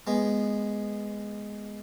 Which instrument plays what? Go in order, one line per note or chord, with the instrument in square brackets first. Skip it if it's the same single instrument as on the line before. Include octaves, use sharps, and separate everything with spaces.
[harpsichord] G#3 B3